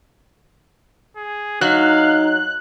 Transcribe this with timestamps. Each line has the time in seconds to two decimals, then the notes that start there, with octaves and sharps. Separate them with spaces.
1.17 G#4
1.61 F#3 D#4 F5 F#6